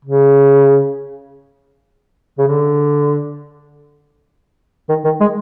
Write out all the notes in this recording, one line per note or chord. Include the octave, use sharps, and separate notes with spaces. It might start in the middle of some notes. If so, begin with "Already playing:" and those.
C#3
C#3
D3
D#3
D#3
G#3